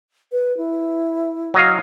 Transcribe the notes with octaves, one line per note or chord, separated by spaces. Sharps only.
B4
E4
F#3 D#5 F5